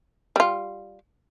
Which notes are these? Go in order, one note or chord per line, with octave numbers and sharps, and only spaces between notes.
G3 F4